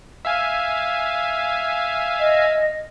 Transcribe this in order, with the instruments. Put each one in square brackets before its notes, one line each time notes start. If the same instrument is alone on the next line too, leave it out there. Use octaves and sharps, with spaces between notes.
[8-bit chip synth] E5 F5 G#5
[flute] D#5